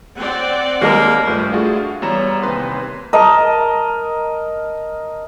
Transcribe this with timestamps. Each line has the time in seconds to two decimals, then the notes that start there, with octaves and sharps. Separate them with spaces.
0.20 C4 D5 F#5
0.81 D#2 G#3 A#3 A#5
1.27 G2 A3 F4 B4 G6
1.52 A3 D4 F4 F#4 G#4
1.77 F5
2.02 E2 G3 C#5 A#5 A#6 E7
2.43 D#2 C3 B4 C6
3.13 A#4 D#5 A5